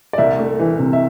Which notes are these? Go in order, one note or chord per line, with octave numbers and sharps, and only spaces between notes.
D5
C2 E5
A3
E3
C3
E5